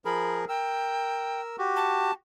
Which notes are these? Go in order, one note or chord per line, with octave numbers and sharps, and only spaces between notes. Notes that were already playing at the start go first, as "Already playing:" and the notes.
F3 G#4 A#4 B5
A#4 G5 E6
F#4 G4
A5